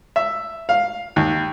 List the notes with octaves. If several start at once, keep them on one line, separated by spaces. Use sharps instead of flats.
E5
F5
D#2